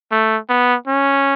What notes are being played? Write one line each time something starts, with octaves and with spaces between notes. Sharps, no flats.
A3
B3
C#4